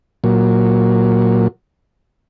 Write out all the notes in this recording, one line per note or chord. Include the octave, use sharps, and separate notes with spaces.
A#2 F#3